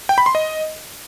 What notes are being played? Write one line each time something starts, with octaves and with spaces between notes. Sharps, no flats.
G5
B5
C6
D#5